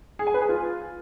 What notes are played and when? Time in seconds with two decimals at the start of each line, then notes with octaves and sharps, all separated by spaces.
0.19 G#4
0.27 G#5
0.34 B4
0.42 G#4
0.49 F4